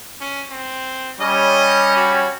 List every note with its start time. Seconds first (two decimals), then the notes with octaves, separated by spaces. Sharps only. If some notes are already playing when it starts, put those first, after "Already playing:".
0.21 C#4
0.51 C4
1.21 G3 C#4 D#5
1.96 F#4